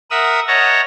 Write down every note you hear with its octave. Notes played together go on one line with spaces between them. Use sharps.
A#4 E5 F#5 D#6 E6
C#5 D#5 F#5 A5 A#5